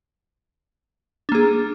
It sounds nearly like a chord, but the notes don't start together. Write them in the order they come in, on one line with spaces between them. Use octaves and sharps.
D4 A#3 G#4